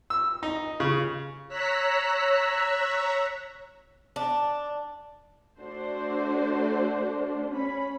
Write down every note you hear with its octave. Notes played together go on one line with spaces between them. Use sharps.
E6
D#4
C#3
C#5 A#5 E6 F#6 B6
D4
A3 D4 F#4 C5
C#4 B5